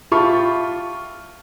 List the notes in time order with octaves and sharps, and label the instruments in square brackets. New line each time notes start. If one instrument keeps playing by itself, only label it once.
[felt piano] F4 G4 E5 A5 B5 C#6